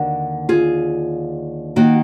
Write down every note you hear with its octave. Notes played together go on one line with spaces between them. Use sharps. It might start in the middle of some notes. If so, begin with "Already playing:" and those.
Already playing: D#2 D3 F#4 A#4
F4 G#4
D#3 A#3 F#4